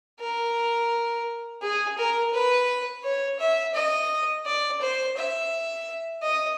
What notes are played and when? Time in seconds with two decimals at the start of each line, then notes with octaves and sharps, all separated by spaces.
0.20 A#4
1.62 G#4
1.97 A#4
2.33 B4
3.03 C#5
3.39 E5
3.74 D#5
4.45 D5
4.80 C5
5.16 E5
6.22 D#5